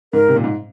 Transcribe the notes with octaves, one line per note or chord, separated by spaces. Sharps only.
G#2 A#4
C3
A#2
G#2